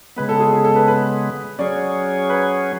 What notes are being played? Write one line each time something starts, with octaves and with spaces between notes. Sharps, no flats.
C#3 G#3 B3 B4
A4
G#4
G#4
A4
B4
B4
F#3 C#4 G#4 D5
B4